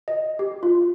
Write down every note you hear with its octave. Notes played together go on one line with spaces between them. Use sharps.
D#5
G4
F4